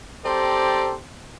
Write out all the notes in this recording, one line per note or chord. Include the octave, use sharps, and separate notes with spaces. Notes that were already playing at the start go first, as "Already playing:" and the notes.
C4 G4 A4 C5 D5 A#5